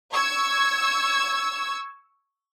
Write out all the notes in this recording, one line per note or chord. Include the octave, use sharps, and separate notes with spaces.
C#6 E6 G#6